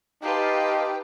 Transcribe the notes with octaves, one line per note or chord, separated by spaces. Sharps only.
D#4 G4 B4 F5 A5 C6